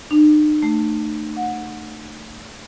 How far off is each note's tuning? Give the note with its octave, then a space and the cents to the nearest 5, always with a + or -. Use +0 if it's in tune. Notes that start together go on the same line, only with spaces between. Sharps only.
D#4 -45
A3 +20
F#5 -20